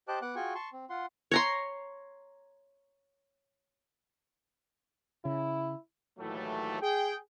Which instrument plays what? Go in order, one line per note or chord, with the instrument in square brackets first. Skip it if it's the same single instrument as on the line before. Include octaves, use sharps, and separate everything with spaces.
[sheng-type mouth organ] G4 C5 D#5 A5 D6 F#6
B3 F#5 D6 F#6
F4 F#4 G#4 G5 G#5 C#6
A5 C6 C#6
C4
F4 F#5 C6
[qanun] C#5 A#5 C6
[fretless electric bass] C#3 [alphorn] E4
[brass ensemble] D#2 A2 E3 F#3 G3 A3
G#4 G5